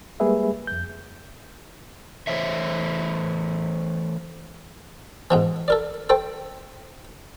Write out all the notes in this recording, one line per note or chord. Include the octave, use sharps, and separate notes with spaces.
G3 G#3 A#3 G#4 B4 E5
F2 G6
E3 A3 C5 C#5 E5
G#2 B2 E3
A4 A#4 D5
A4 C5 G5